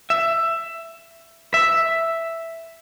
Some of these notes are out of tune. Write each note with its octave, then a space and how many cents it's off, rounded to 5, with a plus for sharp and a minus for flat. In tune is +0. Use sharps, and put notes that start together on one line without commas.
E5 +15
E5 +0